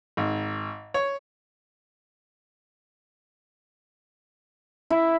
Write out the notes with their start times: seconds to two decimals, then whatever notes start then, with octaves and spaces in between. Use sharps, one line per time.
0.17 G#1
0.94 C#5
4.90 E4